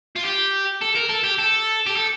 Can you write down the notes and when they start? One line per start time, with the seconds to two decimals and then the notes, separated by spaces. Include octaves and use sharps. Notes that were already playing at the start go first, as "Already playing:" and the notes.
0.16 F4
0.23 G4
0.81 A4
0.95 A#4
1.09 A4
1.24 G4
1.39 A4
1.86 G4
1.96 A4